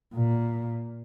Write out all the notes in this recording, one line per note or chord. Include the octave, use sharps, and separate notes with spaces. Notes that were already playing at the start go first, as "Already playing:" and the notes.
A#2